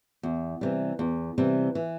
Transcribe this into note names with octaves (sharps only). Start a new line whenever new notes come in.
E2
C3 E3 G3
E2
C3 E3 G3
E3